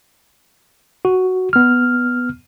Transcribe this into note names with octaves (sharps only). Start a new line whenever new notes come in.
F#4
B3 F6